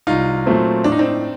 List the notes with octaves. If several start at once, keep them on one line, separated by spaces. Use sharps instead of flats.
C2 D#4 F4
A#2 F#3 A3 C4
A2 D4
D#4
C4 D4